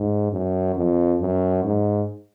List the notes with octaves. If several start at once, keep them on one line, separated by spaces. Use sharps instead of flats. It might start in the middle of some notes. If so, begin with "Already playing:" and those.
Already playing: G#2
F#2
F2
F#2
G#2